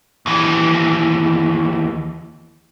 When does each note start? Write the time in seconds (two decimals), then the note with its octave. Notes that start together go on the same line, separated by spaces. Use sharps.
0.26 D#2 E3